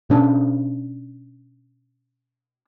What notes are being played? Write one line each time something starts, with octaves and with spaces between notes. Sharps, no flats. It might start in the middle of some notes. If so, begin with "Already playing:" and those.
B2 C#4 D4